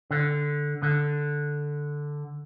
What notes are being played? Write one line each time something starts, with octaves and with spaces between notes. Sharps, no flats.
D3
D3